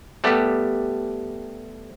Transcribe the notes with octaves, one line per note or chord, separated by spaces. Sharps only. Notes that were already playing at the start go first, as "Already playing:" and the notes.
G3 A3 B3 G4